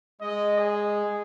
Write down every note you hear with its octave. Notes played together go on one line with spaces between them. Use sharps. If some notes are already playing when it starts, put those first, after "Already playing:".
G#3 D#5
G#4